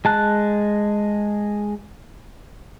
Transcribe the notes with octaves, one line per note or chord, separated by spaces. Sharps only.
G#3 A5 F#6